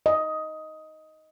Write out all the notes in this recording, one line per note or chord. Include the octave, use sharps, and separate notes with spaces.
D#5